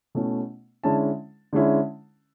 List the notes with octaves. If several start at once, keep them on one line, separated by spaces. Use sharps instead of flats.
B2 A3 C#4 E4
D3 G#3 C#4 E4 A5
D3 G#3 C#4 E4